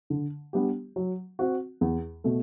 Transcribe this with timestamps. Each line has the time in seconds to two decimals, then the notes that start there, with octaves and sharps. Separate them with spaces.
0.10 D3
0.53 G3 B3 D4 G4
0.96 F#3
1.39 C4 F#4
1.81 E2
2.24 B2 A3